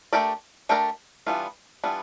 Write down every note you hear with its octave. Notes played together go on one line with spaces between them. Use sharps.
A3 D4 G4 A#4 D5
A3 D4 G4 A#4 D5
E3 G3 B3 D4 F4
E3 G3 B3 D4 F4